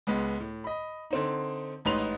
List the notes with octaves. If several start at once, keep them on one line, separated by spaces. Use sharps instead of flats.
C#2 G#3 B3
A2
D#5 B5
D3 C4 D#4
A1 G#2 D#4 B4 C6 F7